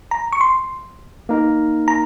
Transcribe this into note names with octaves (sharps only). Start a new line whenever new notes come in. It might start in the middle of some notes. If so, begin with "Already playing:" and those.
A#5
C#6
C6
A#3 D#4 A#4
A#5